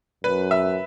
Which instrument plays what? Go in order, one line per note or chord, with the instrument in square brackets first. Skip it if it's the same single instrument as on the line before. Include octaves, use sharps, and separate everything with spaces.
[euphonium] F#2 [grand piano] B4
[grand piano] E5